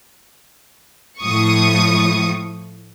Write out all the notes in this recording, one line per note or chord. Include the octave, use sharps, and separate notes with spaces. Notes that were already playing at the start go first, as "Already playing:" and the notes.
A2 F3 C#6 D#6